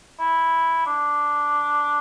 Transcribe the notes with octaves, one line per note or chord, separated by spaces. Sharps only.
E4
D4